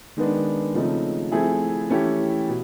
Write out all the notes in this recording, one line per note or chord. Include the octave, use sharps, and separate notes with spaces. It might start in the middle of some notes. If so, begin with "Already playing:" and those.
D#3 G#3 B3 D4
C#3 F3 A3 C4 D#4
F3 A3 C4 E4 G#4
E3 A3 C#4 E4 G4
B2